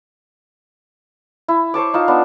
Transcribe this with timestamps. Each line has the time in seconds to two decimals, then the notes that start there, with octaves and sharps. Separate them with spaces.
1.48 E4
1.74 C5 C#5 A5 D6
1.94 D#4 F4 A5
2.08 B3 D4